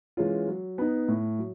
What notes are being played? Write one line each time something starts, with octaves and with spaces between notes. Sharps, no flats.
E3 G#3 C#4 F4
F#3
B3 D#4
A2
F#3